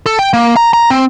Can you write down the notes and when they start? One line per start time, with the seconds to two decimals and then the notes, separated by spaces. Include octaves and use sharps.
0.06 A4
0.19 G5
0.33 A#3
0.57 A#5
0.73 A#5
0.90 C4